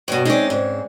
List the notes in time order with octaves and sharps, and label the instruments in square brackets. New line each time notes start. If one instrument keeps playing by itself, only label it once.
[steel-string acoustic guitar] G2 B2 [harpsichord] C#5
[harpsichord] G#3 C4 C#4 [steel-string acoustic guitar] D#4 D5
[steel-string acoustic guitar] G#2